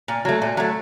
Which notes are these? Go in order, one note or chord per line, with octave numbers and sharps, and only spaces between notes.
A#2
F#3 A3
A#2
F#3 A3